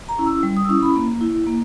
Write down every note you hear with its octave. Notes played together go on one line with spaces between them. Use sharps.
A#5
C#4 E4
E6
G3
D#6
E6
C#4 E4 D#6
B5
A#3
E4
A#3